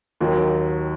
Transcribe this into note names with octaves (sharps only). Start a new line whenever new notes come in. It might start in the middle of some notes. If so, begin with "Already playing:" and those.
D#2 D#3 F#3